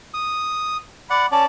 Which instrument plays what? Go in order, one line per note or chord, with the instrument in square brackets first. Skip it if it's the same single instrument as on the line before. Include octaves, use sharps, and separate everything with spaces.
[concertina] D#6
[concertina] D5 F#5 [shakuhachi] B5
[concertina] C#4 D5 [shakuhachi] A5